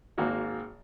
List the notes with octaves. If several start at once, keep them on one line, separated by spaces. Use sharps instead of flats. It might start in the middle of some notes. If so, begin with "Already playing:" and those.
G#1 G#2 A#3 F#4 F#5